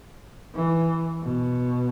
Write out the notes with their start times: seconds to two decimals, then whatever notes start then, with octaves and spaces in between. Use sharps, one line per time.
0.55 E3
1.23 B2